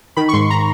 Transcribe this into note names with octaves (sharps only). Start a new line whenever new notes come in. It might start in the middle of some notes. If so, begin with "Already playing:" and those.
D#3 B5
C#6
G#2 C6
A#5